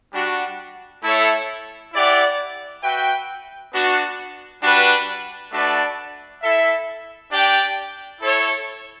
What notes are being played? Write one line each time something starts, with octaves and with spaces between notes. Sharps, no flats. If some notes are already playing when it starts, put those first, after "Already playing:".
G3 D4 F#4
A3 E4 A4 C#5 E5
E4 G4 D5 F#5
F#4 B4 E5 G5
B3 D4 F#4
G3 D4 F#4 B4
A3 D4 F#4 B4 D5
E4 A4 E5
D4 G4 D5 G5
E4 A4 C#5